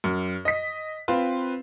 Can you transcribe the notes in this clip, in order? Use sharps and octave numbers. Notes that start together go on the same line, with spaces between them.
F#2
D#5 B6
C4 F4 B4